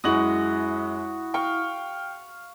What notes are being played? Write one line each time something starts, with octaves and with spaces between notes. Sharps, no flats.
F#2 G#3 E4 F#4 F#5 D#6 F#7
F5 G5 C#6